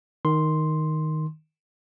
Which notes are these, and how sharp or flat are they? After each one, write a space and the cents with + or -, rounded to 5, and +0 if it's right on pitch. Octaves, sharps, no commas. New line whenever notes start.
D#3 +0 C6 +0